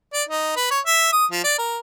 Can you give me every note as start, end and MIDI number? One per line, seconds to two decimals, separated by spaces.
0.13 0.23 74
0.29 0.56 63
0.56 0.68 71
0.71 0.80 73
0.86 1.11 76
1.12 1.25 87
1.31 1.43 53
1.44 1.55 74
1.58 1.78 70